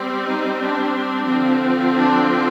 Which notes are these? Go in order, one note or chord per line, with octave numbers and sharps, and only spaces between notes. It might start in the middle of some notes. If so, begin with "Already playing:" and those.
Already playing: G3 C4
D#4
D4
D3 F3 C4
D4